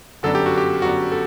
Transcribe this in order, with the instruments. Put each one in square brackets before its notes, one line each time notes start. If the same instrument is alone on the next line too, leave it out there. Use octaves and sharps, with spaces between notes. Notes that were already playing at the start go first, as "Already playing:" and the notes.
[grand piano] G1 F#2 F#3 B3 D4 [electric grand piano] A4
[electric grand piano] G4
F#4
G4
[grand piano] G1 F#2 F#3 B3 D4 [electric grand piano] F#4
[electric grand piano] A4